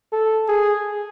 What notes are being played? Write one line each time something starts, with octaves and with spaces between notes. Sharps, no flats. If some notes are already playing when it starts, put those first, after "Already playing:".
A4
G#4